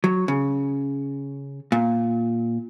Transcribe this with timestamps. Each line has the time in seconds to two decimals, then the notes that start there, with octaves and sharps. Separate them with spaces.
0.04 F#3
0.28 C#3
1.72 A#2